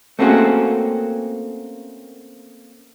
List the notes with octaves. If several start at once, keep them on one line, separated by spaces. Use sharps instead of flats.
A3 A#3 C4 C#4 F#4 G#4